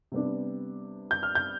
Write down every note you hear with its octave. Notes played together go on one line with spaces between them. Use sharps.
C3 G3 B3 D4
G6
F6
G6